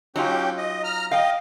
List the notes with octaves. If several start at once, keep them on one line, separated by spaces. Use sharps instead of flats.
F#3 C#4 D#4 F4 G4 G5
D#5
A#5 F6
D#5 F5 G5